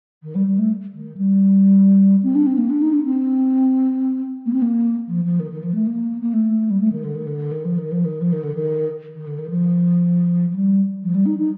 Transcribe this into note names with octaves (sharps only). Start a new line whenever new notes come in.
D#3
G3
G3
A3
D#3
G3
C4
D4
C4
A#3
D4
D#4
D4
C4
A#3
C4
A#3
F3
F3
D#3
D#3
F3
A3
A#3
A#3
A3
G3
A3
D#3
D3
D#3
D3
D#3
F3
D#3
F3
D#3
F3
D#3
D3
D#3
D#3
D3
D#3
F3
F3
G3
F3
G3
D#4
D#4